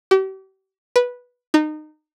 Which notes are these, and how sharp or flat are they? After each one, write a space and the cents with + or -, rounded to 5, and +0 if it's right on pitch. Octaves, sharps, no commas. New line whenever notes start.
G4 -40
B4 -10
D#4 -25